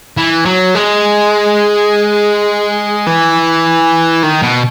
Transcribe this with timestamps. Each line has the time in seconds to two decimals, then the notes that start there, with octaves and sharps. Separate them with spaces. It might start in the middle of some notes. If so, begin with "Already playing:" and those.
0.17 E3
0.45 F#3
0.75 G#3
3.06 E3
4.23 D#3
4.42 B2